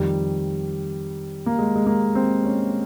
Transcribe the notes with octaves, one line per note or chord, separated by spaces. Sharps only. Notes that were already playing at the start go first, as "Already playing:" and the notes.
Already playing: F2 D#3 G3
A#3
G#3
G#3
A#3
C4
C#4